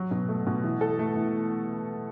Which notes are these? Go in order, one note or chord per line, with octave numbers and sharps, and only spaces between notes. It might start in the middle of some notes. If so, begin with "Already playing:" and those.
Already playing: F#3
B2
A3
B2
E3
A4
A3
E3